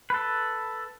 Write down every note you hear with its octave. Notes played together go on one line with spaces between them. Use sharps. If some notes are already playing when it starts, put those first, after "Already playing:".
A4 B4